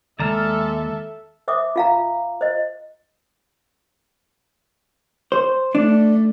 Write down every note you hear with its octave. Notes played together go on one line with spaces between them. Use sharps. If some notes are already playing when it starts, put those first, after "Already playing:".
D#2 G#3 A4 D5 E5 A5 A#5 F6
C5 E5 D6 D#6
F4 F5 A#5
C5 D#5
C5
A3 D4